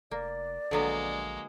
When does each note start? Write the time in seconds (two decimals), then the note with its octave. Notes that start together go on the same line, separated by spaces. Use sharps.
0.11 F1 A#3 D5
0.71 A#1 D3 F#3 G#3 A#3 B3